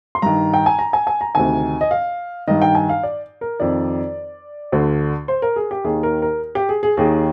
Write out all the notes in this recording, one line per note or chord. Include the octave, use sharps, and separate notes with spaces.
C6
G2 D#3 A#5
G5
G#5
A#5
G#5
G#5
A#5
D2 C3 D#3 G#5
D#5
F5
G2 D#3 D#5
G5
G#5
F5
D5
A#4
F2 D#3 D5
D2 D3
C5
A#4
G#4
G4
D#2 D#3 G#4
A#4
A#4
G4
G#4
G#4
D#2 D#3 G#4